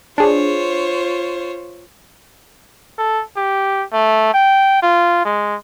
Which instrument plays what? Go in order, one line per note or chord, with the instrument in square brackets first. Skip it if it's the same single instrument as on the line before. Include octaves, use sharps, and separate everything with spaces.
[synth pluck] D4 G#4 [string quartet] F4 C5 C#5
[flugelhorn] A4
G4
A3
G5
F4
G#3